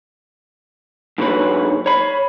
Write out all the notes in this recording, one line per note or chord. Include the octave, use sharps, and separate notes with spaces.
G#2 D3 F#3 B4 C#5
C#5 B5